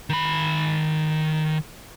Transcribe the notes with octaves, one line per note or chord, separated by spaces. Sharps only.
D#3 B5